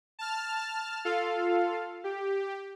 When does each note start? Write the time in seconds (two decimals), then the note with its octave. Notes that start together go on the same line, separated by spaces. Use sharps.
0.19 A5 F6
1.05 F4 A4 F5
2.04 G4